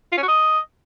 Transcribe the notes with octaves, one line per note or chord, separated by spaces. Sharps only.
F4
C#4
F#4
D#5